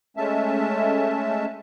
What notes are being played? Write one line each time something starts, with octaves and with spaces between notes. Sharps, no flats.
G#3 A3 C#4 E5 A5